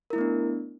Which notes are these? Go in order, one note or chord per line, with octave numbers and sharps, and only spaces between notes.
A3 B3 D4 E4 A#4